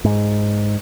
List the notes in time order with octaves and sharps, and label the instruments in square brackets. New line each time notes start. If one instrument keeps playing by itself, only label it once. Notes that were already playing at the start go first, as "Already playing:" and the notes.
[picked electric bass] G#2